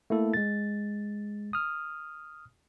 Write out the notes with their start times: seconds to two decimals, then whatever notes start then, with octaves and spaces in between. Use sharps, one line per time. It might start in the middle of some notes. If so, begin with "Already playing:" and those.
0.10 A3 A#3 E4 A4
0.34 G#3 A6
1.53 D#6 F6